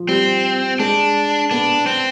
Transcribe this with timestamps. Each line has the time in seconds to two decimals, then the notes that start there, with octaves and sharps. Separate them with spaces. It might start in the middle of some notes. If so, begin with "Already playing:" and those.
Already playing: F3
0.08 G3 C4
0.80 G#3 D4
1.51 B3 D4
1.86 C4